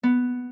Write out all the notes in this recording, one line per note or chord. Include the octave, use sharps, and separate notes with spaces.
B3